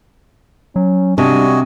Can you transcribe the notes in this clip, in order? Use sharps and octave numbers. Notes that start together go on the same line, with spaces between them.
F#3 C#4
C3 G3 D4 F#4 D#5 G#5